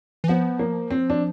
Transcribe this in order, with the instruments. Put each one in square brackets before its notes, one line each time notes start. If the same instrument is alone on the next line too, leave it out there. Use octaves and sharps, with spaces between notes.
[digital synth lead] E3
[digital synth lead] F3 [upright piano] B3
[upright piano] A#3
C4
D4